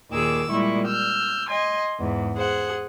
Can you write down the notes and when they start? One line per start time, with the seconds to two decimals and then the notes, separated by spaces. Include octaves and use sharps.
0.12 D#2 A#2 D#3 G#4 D6 E6
0.50 A#2 G3 G#3 E4 C#6
0.85 E6 F6 G6
1.48 D#5 G#5 C6
2.00 E2 G#2
2.35 G#4 C5 F#5